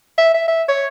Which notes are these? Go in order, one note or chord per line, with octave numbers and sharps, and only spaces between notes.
E5
E5
E5
C#5